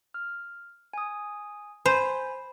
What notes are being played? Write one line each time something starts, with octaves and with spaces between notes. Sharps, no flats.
F6
G#5 D#6
C5 G#5 B5